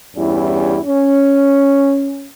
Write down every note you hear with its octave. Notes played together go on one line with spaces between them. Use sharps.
E2 G2 G3 C#4 E4
C#4